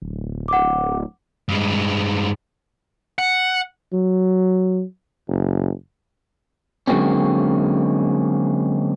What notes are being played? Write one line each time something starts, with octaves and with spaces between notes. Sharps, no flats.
D1
F#5 D6
G2 G#3
F#5
F#3
F#1
D3 F#3 G#3 A#3 C4 C#4